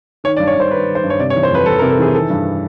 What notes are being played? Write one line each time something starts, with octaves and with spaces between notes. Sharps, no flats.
D#3 C#5
D5
G2
C#5
G2 C5
D#3 B4
D#3
C5
G2
C#5
C3 D5
C#5
E3
C5
F2 B4
F2 A4
A#4
C3
A4
E3 G#4
D#3 A4
G2